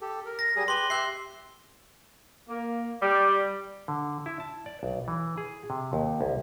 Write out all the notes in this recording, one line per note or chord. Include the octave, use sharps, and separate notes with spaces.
G4 A4
A#4
A#6
G3 G#4
G4 B4 C6 G7
G4 E5 F#6 C7
A#3
G3
D3
E4
A5
D5
B1
E3
G#4
C3
D#2
C2